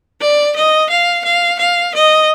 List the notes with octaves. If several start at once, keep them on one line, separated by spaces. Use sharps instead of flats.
D5
D#5
F5
F5
F5
D#5